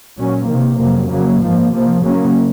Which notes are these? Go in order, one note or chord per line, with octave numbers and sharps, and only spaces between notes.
A#2 F#3 C#4
C3 D#3 A#3
F2 C3 F#3 A#3
C#3 F#3 A#3
G#2 F3 A#3
C3 F3 A#3
C#3 F#3 A#3 C#4